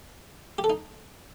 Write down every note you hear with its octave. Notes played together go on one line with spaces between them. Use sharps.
G4
A4
D#4